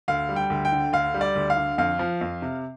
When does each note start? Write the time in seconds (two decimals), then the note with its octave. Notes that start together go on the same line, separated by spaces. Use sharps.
0.08 D2 F5
0.29 G3
0.36 G5
0.50 D2
0.65 G5
0.72 D3
0.93 D2 F5
1.14 G3
1.21 D5
1.36 D2
1.50 F5
1.57 D3
1.78 F2 F5
1.99 F3
2.21 F2
2.42 C3